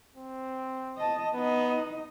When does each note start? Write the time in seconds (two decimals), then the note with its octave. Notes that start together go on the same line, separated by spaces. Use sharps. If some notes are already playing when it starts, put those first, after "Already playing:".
0.17 C4
0.97 D#5 A5
1.34 B3 D#4 D#5